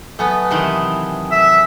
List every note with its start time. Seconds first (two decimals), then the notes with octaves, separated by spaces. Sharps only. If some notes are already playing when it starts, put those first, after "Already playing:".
0.19 F#3 A3 B3 G#5 D#6
0.51 C3 D#3 E3
1.31 E5